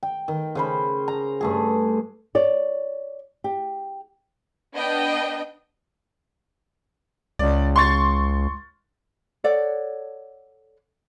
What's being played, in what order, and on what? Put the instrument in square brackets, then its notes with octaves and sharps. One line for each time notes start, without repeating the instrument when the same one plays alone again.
[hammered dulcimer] G5
D#3
C#3 C5 B5
A#5
G2 A3 G#4
[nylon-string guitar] C#5 D5
G4
[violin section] B3 D4 D#5 G5
[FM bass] C#2 [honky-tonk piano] D5
[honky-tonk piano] C6 C#6 A6
[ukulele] A4 C#5 D5 F#5